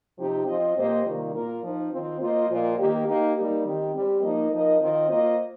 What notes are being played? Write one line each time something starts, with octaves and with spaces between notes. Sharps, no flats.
C3 F3 C4 D#4 G4
F3 C4 F4 D#5
A#2 A#3 G4 C5 D#5
C3 D#3 G3 A#3 F4
A#2 A#3 F4 A#4
F3 D#4 C5
D#3 C4 F4
A#3 F4 C5 D#5
A#2 F3 A#3 F4 D#5
D#3 A#3 G4
A#3 D#4 G4
G3 A#3 D#4
D#3 C4 G4
G3 C4 G4
F3 A#3 D#4 A#4 D#5
F3 D#4 A#4 D#5
D#3 C4 F4 D#5
A#3 F4 C5 D#5